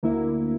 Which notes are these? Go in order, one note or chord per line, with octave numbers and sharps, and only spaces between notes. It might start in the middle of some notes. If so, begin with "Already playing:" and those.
D2 D3 A#3 E4